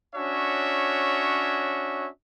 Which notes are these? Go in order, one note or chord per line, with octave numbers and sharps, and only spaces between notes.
C#4 D4 F#4 C#5 E5